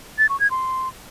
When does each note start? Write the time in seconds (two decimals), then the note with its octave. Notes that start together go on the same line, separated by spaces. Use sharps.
0.18 A6
0.29 C#6
0.40 G#6
0.51 C6